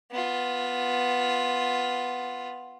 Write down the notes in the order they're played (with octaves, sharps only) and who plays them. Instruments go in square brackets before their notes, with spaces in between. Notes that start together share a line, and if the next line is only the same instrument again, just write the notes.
[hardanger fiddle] B3 F4